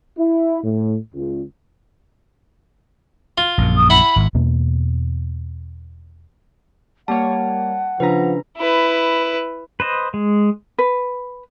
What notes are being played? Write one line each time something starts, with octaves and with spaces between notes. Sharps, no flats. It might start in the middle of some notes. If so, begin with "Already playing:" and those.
E4
A2
C#2
F4
A#1 F#2
D#6
E4 F#5 B5
G#1
E2 B2 A#3
G3 A#3 C#5 F#5 A5
C#3 F3 D4 B4 A#5
E4 B4
B4 C5 D#5
G#3
B4